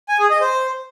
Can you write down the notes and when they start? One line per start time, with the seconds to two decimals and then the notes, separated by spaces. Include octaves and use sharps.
0.09 G#5
0.20 G#4
0.30 D#5
0.41 C5